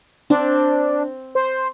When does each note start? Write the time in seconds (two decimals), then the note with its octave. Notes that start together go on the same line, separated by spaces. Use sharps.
0.30 C4 D4
1.35 C5